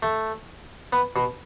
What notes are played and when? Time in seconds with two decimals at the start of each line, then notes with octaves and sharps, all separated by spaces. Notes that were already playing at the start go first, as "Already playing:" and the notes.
0.03 A3
0.93 B3
1.16 B2